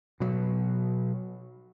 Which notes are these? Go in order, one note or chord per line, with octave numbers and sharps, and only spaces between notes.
B2 F#3